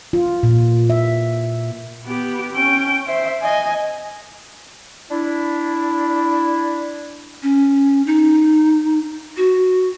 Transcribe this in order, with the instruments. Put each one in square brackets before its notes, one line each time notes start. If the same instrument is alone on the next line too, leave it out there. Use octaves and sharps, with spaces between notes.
[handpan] F4
A#2
E5
[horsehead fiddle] B3 G4
C#4 G5
C5 E5
D#5 G#5
[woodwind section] D4 E4
[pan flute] C#4
D#4
F#4